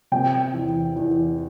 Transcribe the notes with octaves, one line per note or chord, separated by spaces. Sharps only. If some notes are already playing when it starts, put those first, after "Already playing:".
C3 G5
E2
E2